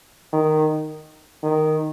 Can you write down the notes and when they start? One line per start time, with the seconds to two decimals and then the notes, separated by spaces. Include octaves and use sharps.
0.33 D#3
1.43 D#3